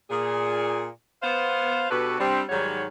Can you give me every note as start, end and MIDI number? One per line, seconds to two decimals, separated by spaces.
0.10 0.84 46
0.10 0.84 68
1.22 1.85 59
1.22 1.85 72
1.22 1.85 77
1.90 2.17 47
1.90 2.17 62
1.90 2.17 66
1.90 2.17 67
1.90 2.17 69
1.90 2.17 71
2.19 2.41 55
2.19 2.41 60
2.19 2.41 62
2.49 2.84 44
2.49 2.84 51
2.49 2.84 54
2.49 2.84 55
2.49 2.84 73
2.49 2.84 78